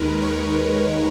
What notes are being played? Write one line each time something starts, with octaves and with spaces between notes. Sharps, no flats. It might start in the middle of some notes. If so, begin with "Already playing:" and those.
Already playing: D#2 D#3 G#3 A#4 B4
C#5